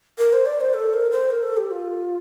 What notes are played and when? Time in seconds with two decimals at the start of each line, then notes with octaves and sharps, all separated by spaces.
0.18 A#4
0.33 C5
0.46 D5
0.61 C5
0.74 A4
0.93 A#4
1.11 C5
1.30 A#4
1.43 A4
1.57 G4
1.71 F4